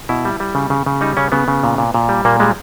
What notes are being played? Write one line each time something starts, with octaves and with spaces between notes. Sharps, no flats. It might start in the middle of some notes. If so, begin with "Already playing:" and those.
B2 E4
G3
G3
C#3
C#3
C#3
G3 D#4
C#3 C#4
C#3 B3
C#3
A#2
A#2
A#2
G3
A#2 A#3
G3 G#3